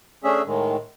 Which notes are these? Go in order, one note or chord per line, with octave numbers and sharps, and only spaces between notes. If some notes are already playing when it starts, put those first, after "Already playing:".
A3 C#4 D4 G#4 E5
A2 D#3 G#3